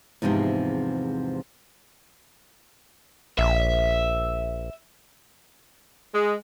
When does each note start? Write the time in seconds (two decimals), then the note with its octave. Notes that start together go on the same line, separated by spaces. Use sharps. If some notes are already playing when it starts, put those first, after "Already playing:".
0.22 E2 G#2 C3 F3 C4
3.38 A#1 E5
6.14 G#3